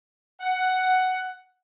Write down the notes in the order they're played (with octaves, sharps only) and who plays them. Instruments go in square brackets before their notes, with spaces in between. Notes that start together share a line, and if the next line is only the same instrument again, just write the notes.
[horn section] F#5